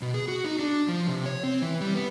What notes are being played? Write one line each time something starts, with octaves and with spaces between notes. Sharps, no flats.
B2
G#4
F#4
D#4
D4
F3
C3
C#5
C4
E3
G3
B3